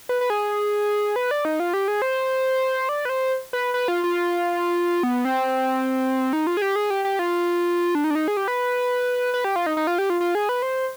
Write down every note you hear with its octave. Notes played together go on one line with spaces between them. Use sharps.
B4
B4
G#4
B4
D5
D#4
F4
G4
G#4
C5
D5
B4
C5
B4
B4
F4
F4
B3
C4
D#4
F4
G#4
G4
G#4
G4
G4
F4
D4
D#4
D4
D#4
G#4
G4
B4
B4
G4
F4
D#4
D#4
F4
G4
F4
F4
G#4
B4
C5